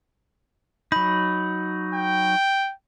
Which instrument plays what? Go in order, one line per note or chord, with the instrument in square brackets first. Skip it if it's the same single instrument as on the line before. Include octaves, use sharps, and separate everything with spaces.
[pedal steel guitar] F#3 D#4 [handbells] B5
[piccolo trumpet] G5